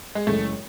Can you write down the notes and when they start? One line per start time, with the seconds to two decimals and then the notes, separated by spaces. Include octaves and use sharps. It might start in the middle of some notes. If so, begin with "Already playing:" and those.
0.15 G#3
0.27 F#1 F#2 E3 G#3 A3